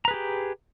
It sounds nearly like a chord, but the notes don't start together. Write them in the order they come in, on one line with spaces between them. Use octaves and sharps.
A#5 B4 G#4 G4